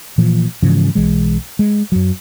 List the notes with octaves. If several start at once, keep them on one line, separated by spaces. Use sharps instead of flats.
A#2 E3 F3
G#2 C#3 E3 F3
B1 E3 G#3
G#3
F#2 F#3